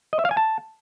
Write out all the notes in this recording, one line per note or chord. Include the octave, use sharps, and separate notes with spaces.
D#5
E5
F5
G#5
A5